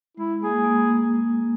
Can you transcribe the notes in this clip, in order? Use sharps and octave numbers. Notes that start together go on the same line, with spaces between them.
G#3 E4
A#3 G#4
G#3
A#3